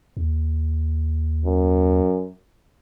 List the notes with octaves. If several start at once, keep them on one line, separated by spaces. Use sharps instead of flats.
D#2
F#2